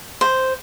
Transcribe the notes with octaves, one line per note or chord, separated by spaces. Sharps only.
C5